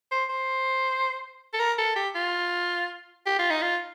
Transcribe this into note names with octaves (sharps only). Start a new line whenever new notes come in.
C5
C5
A4
A#4
A4
G4
F4
G4
F4
D#4
F4